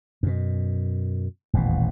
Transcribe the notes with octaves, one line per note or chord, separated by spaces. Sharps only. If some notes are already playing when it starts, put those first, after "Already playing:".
F#2 B2
D#1 A1 E2 B2